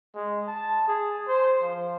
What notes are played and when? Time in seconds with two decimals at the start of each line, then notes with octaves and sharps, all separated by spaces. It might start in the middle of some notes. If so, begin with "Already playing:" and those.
0.15 G#3
0.47 A5
0.87 G#4
1.28 C5
1.62 F3